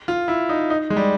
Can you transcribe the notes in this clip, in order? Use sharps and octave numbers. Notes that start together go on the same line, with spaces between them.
F4
E4
D#4
D#4
G#3
G3